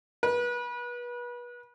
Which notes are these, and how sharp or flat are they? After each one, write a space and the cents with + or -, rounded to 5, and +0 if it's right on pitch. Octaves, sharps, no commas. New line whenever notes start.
B4 -30